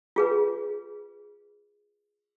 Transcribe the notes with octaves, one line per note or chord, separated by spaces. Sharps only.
F4 G#4 B4